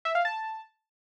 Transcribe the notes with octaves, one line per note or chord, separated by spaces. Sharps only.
E5
F5
A5